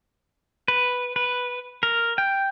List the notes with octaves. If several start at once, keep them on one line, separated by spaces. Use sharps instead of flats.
B4
B4
A#4
G5